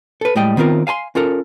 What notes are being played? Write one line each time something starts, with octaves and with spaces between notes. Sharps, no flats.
A4 B4
A2 G3 G#3 D#5 G5
D#3 B3 C4 F4 A#4
F5 G#5 A5 C6
C#4 F4 A4 A#4